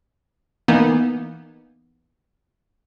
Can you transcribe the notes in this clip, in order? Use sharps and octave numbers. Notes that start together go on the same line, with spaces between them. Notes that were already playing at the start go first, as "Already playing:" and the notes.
E3 A#3 B3 D#4